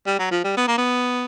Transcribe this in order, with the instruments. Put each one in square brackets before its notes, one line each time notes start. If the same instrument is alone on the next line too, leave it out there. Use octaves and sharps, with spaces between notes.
[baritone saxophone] G3
F#3
F3
G3
B3
A#3
B3